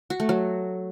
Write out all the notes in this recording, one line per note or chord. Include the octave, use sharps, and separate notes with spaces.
F#4
A3
F#3